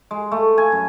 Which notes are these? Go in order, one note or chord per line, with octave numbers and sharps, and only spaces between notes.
G#3
A3
G#5
F#2